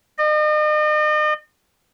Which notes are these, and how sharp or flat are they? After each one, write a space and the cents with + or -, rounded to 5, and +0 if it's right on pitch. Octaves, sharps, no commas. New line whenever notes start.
D#5 -40